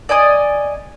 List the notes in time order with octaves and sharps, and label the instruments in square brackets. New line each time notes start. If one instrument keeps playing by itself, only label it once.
[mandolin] D5 D#5 G#5 D#6